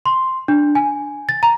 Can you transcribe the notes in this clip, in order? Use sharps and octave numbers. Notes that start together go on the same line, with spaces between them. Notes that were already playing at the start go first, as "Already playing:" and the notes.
C6
D4
G#5
A6
A#5